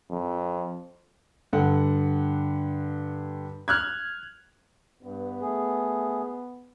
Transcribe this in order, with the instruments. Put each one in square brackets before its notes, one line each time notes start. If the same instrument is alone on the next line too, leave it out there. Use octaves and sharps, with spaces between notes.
[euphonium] F2
[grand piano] G2 D3 F#5
F6 F#6 G#6
[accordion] G2 [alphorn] B3
[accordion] A3 G#4